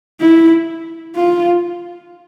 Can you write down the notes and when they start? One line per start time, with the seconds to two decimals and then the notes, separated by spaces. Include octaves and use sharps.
0.20 E4
1.16 F4